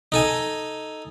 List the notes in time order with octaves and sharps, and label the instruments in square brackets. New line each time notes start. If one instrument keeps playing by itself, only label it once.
[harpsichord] D#4 A4 G#5